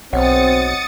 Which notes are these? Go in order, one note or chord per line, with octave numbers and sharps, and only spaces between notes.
B1 C4 C#5 D#5 F#5 D#6 A6 C#7